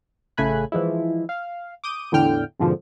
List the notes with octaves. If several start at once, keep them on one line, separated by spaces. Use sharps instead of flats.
A1 C#3 A3 G#5 B5 F#6
E3 F3 G#3 E4
F5
D6 D#6 G6 D#7
E2 A2 D3 G5 F6 G6
F2 G#2 B2 D3 F3